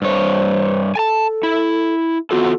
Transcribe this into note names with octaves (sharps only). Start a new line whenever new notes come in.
G2 C5 C#5
A4 G#5 A5
E4
B3 F4 F#4 A4